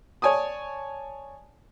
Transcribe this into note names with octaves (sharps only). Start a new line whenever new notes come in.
C#5 D5 G#5 A5 D#6